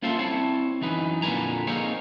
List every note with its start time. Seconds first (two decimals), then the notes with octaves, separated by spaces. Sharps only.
0.02 A#3 C#4 F4 A4 C5 E5
0.19 C4 E4 C#5 A5
0.81 F#2 E3 D#4 B4
1.22 F2 A#2 D3 B4 G#5 A#5
1.67 A#3 C4 D#4 G#4 A#4 C#5